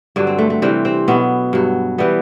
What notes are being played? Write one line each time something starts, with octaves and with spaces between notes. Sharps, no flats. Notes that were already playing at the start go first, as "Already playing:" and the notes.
G2 D3 F#3 D4
C4
A3
A3
C3 E3 G3 C4
C4
B2 F#3 B3
G2 F#3
E3 G3 B3